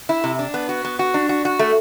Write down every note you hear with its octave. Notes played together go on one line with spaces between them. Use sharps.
E4
C3
D4
B3
F#4
B3
F#4
D4
F#4
F#4
A3